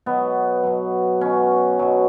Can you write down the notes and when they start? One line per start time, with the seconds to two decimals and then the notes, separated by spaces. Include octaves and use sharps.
0.06 B2 F#3 B3
0.64 B2 F#3
1.21 B2 F#3 C#4
1.79 B2 F#3